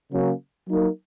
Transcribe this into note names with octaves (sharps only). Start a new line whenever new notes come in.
C#3 F#3 A#3 C#4
F#3 A#3 D#4 A#4